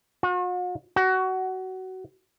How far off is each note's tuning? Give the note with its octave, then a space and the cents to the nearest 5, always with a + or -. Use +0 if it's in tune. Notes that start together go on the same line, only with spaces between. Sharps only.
F#4 -45
F#4 +20